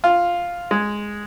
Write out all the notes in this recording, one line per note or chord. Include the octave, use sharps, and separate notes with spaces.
F4
G#3